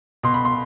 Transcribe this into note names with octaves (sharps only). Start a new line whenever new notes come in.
B2 C6
B5
C6